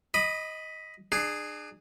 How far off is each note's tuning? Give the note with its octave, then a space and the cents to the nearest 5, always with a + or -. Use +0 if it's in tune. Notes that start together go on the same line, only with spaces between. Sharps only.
D#5 +15 B5 +0 D#6 -30
D4 +35 G#4 +0